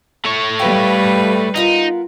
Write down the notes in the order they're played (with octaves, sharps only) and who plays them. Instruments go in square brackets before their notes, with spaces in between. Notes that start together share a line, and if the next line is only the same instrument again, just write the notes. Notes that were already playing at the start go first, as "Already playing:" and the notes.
[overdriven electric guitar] A3 C#5
[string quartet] G3 B4 [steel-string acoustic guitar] G4 F5 G5
[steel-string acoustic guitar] B3 F4 A#4 [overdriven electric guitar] D#4